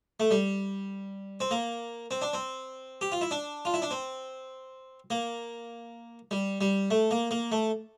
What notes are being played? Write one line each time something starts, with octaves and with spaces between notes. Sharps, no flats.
A3
G3
C4
A#3
C4
D4
C4
G4
F4
E4
D4
F4
E4
D4
C4
A#3
G3
G3
A3
A#3
A#3
A3